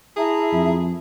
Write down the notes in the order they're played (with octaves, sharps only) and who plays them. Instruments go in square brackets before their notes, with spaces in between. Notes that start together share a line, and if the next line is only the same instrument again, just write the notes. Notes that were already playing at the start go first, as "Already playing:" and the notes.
[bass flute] E4 [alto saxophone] G#4 [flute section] E5 A5 A#5
[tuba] F2